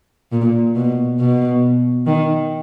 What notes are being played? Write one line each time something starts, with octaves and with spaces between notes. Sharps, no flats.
A#2
B2
B2
D#3